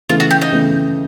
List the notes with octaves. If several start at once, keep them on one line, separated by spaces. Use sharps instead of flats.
C#3 E3 A3 F4
F#4
G4
D#4
C#3 E3 A3